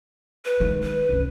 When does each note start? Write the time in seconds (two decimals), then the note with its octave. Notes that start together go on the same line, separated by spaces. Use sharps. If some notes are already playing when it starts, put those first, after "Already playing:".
0.45 B4
0.60 D#3 G#3
0.83 B4
1.09 C2 C#4